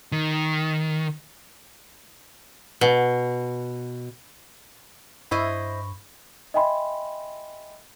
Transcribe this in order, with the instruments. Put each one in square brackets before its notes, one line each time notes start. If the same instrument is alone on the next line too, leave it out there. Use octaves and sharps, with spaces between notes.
[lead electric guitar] D#3
[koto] B2
[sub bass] G2 [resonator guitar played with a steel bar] E4 C5 D#5 [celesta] B5 C#6
[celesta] D#5 E5 G5 G#5 B5 C6